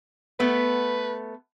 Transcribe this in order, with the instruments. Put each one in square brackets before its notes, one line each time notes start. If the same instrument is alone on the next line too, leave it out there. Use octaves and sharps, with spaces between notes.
[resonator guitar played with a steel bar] A3 B3 [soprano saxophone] B4